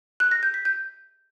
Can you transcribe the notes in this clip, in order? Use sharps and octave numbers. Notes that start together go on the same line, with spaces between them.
F#6
A#6
G6
B6
G6